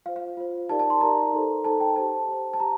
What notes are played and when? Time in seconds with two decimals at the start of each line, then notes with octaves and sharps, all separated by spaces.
0.06 F4 F5
0.08 C5
0.16 F5
0.37 F4 C5
0.69 D#4 G4 A#4 D5 A5
0.80 A5
0.90 C6
1.01 D#4 G4 A#4 D5 A#5
1.33 D#4 A4 C5
1.65 D#4 A4 C5 A5
1.80 G5
1.96 G4 C5 A5
2.28 G4 C5
2.53 A5
2.60 G4 A#5